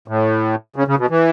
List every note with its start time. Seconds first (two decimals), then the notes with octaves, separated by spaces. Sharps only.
0.08 A2
0.76 C#3
0.87 C#3
0.98 B2
1.10 E3